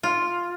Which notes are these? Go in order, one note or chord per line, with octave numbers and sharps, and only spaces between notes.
F4